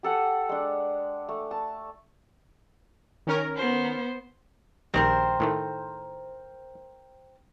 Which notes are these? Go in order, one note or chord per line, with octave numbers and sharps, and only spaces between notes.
G4 A4 F#5 G#5
G#3 D4
A3
A5
D#3 C#4 A#4
B3 C5
A#1 D#3 G3 C4 A#4 C5
A2 D#3 A3